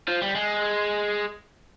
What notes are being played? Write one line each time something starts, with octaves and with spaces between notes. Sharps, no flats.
F3
G3
G#3